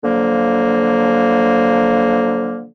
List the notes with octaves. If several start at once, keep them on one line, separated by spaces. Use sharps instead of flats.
D3 F3 F#3 A#3